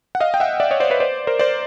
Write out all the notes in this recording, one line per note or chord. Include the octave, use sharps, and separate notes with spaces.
F#5
D#5 F5
G5
E5 F#5
D5 E5
C#5 D#5
C5 D5
B4 C#5
C5 D5
A#4 C5
C5 D5